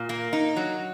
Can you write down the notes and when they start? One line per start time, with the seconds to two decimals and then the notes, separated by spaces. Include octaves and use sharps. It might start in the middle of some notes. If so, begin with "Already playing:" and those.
Already playing: A#2
0.09 A#3
0.33 D#4
0.57 F#3